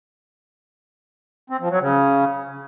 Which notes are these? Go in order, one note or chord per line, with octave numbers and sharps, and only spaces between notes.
C4
F3
F#3
C#3